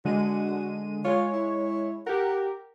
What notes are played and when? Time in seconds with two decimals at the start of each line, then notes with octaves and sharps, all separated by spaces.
0.05 D3 G#3 F#4 D#7
1.05 G#3 F4 C#5
1.32 E4
2.07 G4 A#4 F#5